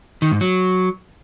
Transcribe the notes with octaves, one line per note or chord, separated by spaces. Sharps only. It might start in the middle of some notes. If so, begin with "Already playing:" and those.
D#3
G#2
F#3